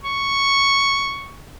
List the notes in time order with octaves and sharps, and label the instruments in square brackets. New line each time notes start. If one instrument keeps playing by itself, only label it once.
[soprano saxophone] C#6